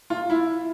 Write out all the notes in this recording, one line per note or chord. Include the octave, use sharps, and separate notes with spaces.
F4
E4